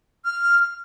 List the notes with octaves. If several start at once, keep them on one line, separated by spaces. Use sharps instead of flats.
F6